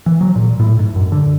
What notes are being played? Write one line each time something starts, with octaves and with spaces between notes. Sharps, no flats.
E3
F#3
A#2
A2
G#2
F#2
D3